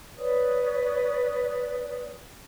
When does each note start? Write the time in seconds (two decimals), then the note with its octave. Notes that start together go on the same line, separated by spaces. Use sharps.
0.17 B4 C#5 D5 D#6